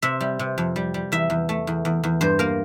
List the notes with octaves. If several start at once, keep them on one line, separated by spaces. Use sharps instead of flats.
C3 E5
G3
C3
F2
G3
G3
E2 E5
E2
A3
E2
E2
E2
G2 C5
A#3 A#4